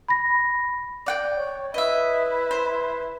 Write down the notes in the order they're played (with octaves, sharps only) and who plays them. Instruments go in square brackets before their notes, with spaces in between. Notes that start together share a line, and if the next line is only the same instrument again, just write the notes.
[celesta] B5 A#6
[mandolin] D5 F#5 G5
[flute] C#5
[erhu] E4 [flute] B4 [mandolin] D#5 E5
[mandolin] C5